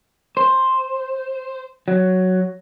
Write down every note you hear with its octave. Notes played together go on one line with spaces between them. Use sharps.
C5
F#3